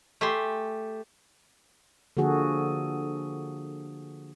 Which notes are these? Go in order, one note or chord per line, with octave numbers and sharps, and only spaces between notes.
A3 G4 G#5 C6
D3 F3 A#3 F#4 G#4 A4